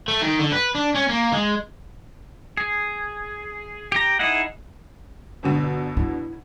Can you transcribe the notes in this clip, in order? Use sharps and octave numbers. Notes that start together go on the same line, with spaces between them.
A3
D#3
D3
B4
D4
C#4
A#3
G#3
G#4
G4 A#5
D#4 E4 G#4 F#5
G1 B2 D3
E4